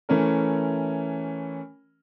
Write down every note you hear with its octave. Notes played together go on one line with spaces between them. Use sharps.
E3 A3 C#4 A#4